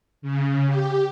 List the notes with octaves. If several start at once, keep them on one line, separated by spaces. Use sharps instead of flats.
C#3
G4